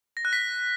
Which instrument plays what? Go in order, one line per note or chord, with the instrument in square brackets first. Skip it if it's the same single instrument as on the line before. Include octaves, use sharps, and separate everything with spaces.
[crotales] A#6
F#6
B6